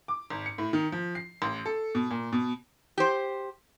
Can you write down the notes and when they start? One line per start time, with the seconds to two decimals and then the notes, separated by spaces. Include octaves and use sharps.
0.08 D6
0.30 G#1
0.46 C#7
0.58 A2
0.73 D#3
0.92 F3
1.15 C7
1.42 A1
1.66 A4
1.95 B2
2.10 A#2
2.32 B2
2.98 G4 C5